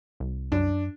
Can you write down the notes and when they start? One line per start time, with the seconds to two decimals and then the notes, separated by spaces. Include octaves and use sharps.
0.20 C2
0.52 F#2 D4